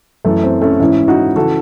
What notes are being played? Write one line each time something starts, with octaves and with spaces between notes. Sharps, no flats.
F#2 E3 A3
C4
A3 C#4
G#2 E3 C#4 E4
D#4 F#4
C#3 E3 F#4 A4